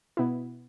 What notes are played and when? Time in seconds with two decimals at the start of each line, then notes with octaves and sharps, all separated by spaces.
0.17 B2 B3 E4